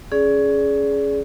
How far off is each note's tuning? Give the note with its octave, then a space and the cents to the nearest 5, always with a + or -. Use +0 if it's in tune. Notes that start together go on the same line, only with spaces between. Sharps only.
C#4 +0 G#4 +15 D5 -20